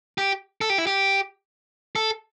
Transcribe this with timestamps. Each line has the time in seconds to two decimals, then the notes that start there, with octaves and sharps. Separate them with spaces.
0.18 G4
0.61 A4
0.70 G4
0.78 E4
0.87 G4
1.96 A4